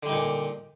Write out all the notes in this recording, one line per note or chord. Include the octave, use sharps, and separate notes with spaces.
A#2 D3 G3 D#4